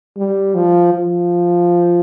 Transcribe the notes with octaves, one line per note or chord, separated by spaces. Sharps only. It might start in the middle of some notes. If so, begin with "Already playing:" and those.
G3
F3
F3